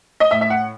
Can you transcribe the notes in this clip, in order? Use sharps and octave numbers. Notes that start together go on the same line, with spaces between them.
D#5
A2 E5
E5
F#5